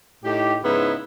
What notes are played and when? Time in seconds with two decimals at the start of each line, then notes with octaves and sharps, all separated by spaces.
0.24 A2 D#4 G4
0.63 G#2 C#3 B3 D#4 E4